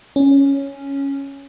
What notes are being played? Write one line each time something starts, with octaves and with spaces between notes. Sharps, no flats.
C#4